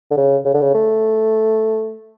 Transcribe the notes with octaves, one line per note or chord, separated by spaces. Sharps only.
D3
C#3
C#3
D3
C#3
A3